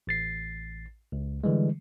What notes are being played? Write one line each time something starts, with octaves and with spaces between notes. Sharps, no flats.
A1 A6 C7
C#2
D3 E3 G3 G#3